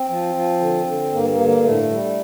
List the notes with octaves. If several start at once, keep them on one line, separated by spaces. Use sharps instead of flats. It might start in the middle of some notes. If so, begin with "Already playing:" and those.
Already playing: C4
F3
F3
D3
D3
G2 A#3
A#3
D3
A#3
A2 A3
G3